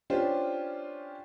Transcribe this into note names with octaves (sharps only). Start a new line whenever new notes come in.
C#4 D4 F4 G4 C5